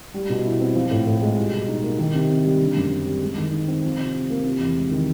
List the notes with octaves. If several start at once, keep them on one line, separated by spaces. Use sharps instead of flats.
G3
B2
E4
C4
F3
A2
A2
G#3
G3
B2
D#4
A#3
D#3
C3
C3
G3
D3
F#2
C4
G3
G#3
D#3
D#4
C4
F3
C3
C3
A#3
C3
E2
G#3
D#3